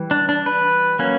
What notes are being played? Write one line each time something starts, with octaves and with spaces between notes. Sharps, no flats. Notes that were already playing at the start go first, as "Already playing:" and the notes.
Already playing: E3 G3
D4
D4
B4
F#3 A#3 C#4